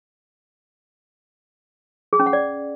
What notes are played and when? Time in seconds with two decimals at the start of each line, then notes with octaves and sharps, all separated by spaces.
2.13 G#4
2.19 C#4
2.26 F#5
2.33 D5